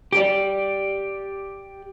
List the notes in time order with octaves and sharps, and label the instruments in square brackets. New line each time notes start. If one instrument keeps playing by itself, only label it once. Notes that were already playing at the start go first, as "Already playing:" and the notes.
[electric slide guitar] G4 D5